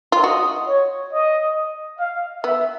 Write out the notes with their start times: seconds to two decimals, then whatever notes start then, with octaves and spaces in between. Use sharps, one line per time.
0.12 F4
0.24 F#4 D#5
0.67 C#5
1.12 D#5
1.99 F5
2.43 B3 E5